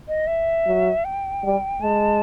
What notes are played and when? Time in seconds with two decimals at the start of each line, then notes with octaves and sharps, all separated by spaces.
0.08 D#5
0.27 E5
0.66 F#3
1.05 G5
1.44 G3
1.81 G#3 A5